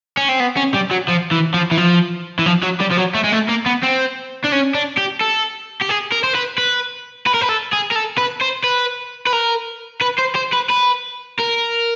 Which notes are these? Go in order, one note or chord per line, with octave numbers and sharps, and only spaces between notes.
C#4
C4
B3
C#4
G3
F#3
F3
E3
F3
E3
F3
E3
F3
F#3
G3
F3
F#3
A3
G#3
A3
A#3
B3
C4
D4
C#4
D4
G4
A4
G4
G#4
A#4
C5
B4
B4
B4
A#4
B4
A4
G#4
A#4
A4
B4
C5
B4
B4
A#4
B4
C5
C5
B4
B4
A#4